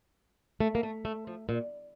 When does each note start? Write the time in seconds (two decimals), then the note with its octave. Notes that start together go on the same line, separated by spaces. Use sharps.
0.60 A3
0.75 A#3
0.83 A3
1.05 A3
1.27 F3
1.49 A#2